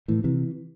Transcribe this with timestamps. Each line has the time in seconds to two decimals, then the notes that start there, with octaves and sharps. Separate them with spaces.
0.08 A2 E3
0.24 C3 E3